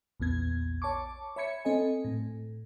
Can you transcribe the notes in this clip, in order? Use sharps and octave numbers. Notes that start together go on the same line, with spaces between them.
A#1 E2 B3 G#6
C#5 A5 C#6 D6
C#5 E5 B5 G#6 C#7
C4 A4 D#5 G#5
A2